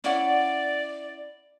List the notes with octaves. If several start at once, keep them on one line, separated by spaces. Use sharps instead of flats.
C#4 E4 D5 F#5